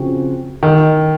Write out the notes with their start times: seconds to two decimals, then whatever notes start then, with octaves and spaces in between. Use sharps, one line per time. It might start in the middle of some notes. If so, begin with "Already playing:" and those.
Already playing: C#3 F3 C4 F#4
0.63 D#3